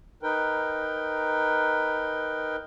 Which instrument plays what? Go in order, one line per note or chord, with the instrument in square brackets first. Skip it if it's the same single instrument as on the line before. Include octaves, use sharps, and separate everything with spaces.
[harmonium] D#4 A#4 B4 G5